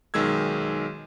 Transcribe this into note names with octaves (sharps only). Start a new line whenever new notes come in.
B1 D#3 G#3 E6 G#6